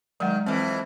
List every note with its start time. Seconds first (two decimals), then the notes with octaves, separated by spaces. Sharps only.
0.20 D#3 F#3 G#3 F#5
0.46 F2 E3 C4